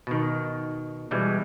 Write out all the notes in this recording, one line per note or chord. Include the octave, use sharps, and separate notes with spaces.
B2 D#3
B2 E3 G3 G#3